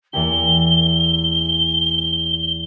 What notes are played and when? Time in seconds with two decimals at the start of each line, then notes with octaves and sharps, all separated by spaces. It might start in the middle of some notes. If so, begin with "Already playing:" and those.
0.13 E2 A#3 G4 G7